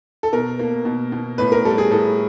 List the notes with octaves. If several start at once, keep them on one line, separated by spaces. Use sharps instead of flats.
A4
B2 A#4
A#3
B2
B2
A2 B4
A#4
G3 A4
G#4
A2 A4